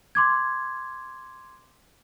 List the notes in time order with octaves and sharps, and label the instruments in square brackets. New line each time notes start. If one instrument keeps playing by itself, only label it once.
[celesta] C6 D6 G#6